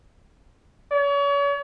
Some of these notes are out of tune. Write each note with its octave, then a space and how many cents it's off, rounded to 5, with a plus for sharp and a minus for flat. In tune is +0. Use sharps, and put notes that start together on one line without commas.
C#5 +40